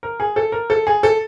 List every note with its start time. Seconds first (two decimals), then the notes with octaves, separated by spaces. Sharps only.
0.03 A#4
0.20 G#4
0.36 A4
0.52 A#4
0.70 A4
0.87 G#4
1.03 A4